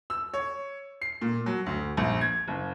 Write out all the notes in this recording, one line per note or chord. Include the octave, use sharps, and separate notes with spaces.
E6
C#5
C7
A#2
F#3
D2
A#1
G#6
F#1